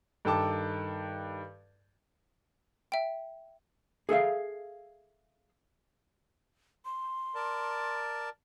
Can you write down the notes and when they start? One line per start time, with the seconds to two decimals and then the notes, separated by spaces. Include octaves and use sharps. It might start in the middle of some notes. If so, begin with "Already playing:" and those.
0.25 G2 D#3 A4 G5 A5 D6
2.92 E5 G5
4.09 G#4 A4 E5 F5
6.85 C6
7.35 A#4 D5 A5